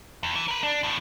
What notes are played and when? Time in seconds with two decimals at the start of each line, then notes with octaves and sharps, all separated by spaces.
0.23 E2
0.36 E3
0.48 A#4 B4
0.63 D4
0.83 E2 A2